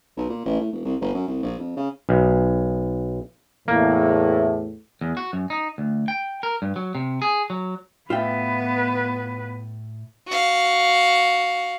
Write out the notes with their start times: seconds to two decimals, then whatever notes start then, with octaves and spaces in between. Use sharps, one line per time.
0.17 B1
0.29 A#2
0.46 A1
0.60 A2
0.73 E1
0.85 C2
1.01 G1
1.14 F#2
1.28 C2
1.43 A#1
1.59 F2
1.77 C#3
2.09 B1
3.68 E2 A2 A#3
5.01 E2
5.17 F#4
5.33 F#2
5.50 D#4
5.78 D2
6.08 G5
6.43 A#4
6.62 G2
6.76 F#3
6.95 C3
7.22 G#4
7.50 F#3
8.10 A2 B3 F4 B4 E5 G5
10.28 F#4 F5